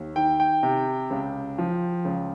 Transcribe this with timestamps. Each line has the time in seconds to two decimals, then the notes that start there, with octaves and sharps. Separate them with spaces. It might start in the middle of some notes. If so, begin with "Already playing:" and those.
Already playing: D#2
0.16 D#3 G5
0.40 G5
0.63 C3
1.11 C#2
1.58 F3
2.05 C#2